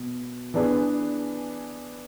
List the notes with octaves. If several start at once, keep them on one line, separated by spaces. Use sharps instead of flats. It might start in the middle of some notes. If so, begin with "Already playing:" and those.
Already playing: B2
E3 B3 D4 G#4 B4